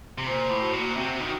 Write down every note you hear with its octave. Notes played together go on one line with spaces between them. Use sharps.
C3
A#2 C5
A2
F#4
A#2
C3 F#4
D#3